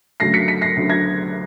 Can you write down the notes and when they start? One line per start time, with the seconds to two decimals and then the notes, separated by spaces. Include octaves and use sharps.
0.20 D2 C#3 F#3 A3 A#6 C7
0.34 B6 C#7
0.48 B6 C#7
0.61 A#6 C7
0.76 D2 C#3 F#3 A3
0.89 G#6 A#6